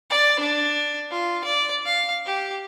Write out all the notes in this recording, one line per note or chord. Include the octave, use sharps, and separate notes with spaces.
D5
D4
F4
D5
F5
G4